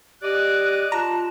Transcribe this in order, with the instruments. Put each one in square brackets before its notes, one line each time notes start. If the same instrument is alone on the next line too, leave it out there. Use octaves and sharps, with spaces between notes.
[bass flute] G4 [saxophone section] D5 D#5 [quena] F#6
[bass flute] F4 [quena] A5 [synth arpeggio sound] A#5